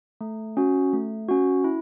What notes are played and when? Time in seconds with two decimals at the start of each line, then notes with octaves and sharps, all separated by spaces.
0.21 A3
0.57 C#4 F#4
0.93 A3
1.29 C#4 F#4
1.64 E4